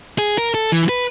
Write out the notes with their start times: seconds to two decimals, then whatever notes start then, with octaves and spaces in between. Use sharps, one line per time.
0.19 G#4
0.38 A#4
0.54 A4
0.72 E3
0.89 B4